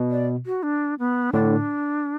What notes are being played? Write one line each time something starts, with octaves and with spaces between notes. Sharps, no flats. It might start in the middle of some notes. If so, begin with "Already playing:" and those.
Already playing: B2
D5
F#4
D4
B3
A2 D3 D4